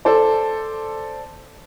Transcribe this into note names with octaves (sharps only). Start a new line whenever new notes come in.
A4 C5 D5